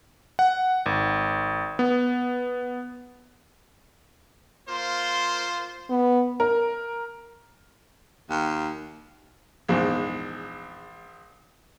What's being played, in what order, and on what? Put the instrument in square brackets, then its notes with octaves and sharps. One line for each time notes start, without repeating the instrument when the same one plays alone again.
[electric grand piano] F#5
G#1
B3
[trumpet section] A#3 F4 C5
[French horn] B3
[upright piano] A#4
[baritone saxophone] D#2
[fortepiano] A#1 E2 G#2